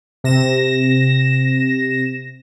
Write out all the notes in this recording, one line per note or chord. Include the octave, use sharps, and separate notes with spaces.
C3 A#6 E7